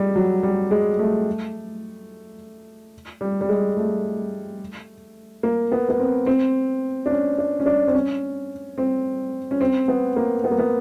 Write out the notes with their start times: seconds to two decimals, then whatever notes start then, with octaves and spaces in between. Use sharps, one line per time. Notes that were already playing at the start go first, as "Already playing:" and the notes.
Already playing: G3 G#3
0.16 F#3
0.43 G3
0.71 G#3
0.99 A3
3.21 G3
3.41 G3
3.49 G#3
3.77 A3
5.43 A#3
5.72 B3
5.89 B3
5.99 C4
6.26 C4
7.06 D4
7.11 C#4
7.38 D4
7.60 C#4
7.66 D4
7.87 C4
7.94 C#4
8.78 C4
9.51 C#4
9.61 C4
9.88 B3
10.16 A#3
10.44 B3
10.51 A#3
10.59 B3